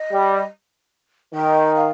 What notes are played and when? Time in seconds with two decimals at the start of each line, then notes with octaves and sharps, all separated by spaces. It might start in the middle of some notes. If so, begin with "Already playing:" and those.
Already playing: D#5
0.12 G3
1.34 D#3 G5
1.75 F5